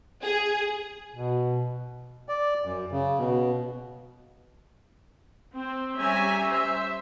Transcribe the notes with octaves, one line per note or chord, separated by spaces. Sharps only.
G#4
B2
D5
F#2
C#3
B2
C4
G3 C#4 E5 G#5 A#5
C5 E5